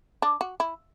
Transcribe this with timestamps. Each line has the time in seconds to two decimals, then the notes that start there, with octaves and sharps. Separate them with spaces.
0.22 D4
0.41 F#4
0.60 E4